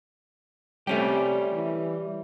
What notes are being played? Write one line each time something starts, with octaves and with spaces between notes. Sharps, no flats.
C3 G3 A3 C#4 G4
E3